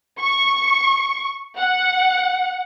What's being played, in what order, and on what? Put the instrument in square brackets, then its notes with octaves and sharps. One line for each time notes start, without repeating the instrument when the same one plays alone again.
[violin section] C#6
F#5